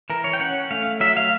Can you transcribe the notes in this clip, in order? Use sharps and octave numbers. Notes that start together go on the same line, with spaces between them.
E3 A#4
C#5
G5
C#4 F#5
A3 F5
F#3 E5
F5